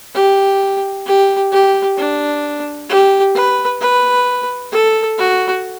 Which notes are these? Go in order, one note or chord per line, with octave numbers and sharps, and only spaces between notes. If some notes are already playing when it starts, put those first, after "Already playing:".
G4
G4
G4
D4
G4
B4
B4
A4
F#4